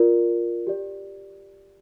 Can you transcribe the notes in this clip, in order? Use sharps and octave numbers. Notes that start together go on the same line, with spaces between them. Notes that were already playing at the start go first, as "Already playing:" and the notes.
Already playing: F4 A#4 D5
G4 D5